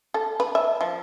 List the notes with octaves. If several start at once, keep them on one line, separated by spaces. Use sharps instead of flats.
A4
B4
E5
F3